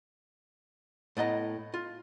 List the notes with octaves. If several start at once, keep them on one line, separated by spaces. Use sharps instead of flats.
A2 B3 D#5 A#5
F4